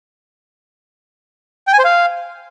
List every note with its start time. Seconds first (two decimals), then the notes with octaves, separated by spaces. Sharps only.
1.67 G5
1.73 G#5
1.79 C5
1.84 F5